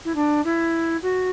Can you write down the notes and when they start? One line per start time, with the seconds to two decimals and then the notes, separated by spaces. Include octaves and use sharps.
0.04 E4
0.15 D4
0.44 E4
1.02 F#4